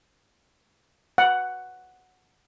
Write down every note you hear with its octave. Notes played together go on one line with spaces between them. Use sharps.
F#5